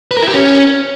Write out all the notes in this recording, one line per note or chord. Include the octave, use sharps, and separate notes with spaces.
B4
A#4
E4
G4
C#4